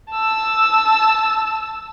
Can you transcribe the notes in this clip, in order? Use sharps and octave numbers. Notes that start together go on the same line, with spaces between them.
A5 E6